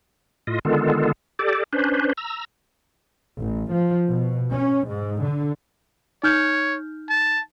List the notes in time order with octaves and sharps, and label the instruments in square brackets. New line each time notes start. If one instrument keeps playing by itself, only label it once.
[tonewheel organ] A2 F4 D#5
D3 D#3 G#3 B3 F4 A4
G4 A4 D5
C#4 D4 B4 C5
A#5 E6
[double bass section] A1
F3
B2
C#4
G#2
D3
[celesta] D#4 F6 G6 [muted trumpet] C#5
[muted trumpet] A5